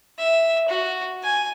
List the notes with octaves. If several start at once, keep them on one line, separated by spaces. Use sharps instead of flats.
E5
F#4
G#5